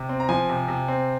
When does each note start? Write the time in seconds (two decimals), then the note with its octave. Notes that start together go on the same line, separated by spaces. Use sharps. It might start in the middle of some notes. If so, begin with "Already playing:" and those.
Already playing: C3
0.09 C4
0.20 A#5
0.29 F3 G#5
0.49 C3
0.68 C3
0.88 C4